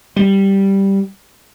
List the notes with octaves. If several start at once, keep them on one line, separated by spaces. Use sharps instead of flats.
G3